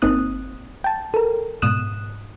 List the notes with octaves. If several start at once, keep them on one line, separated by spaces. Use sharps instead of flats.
G1 A#3 C4 D#4 D#6 F#6
G5 A5
A4 A#4
G#2 B2 D#6 F#6 E7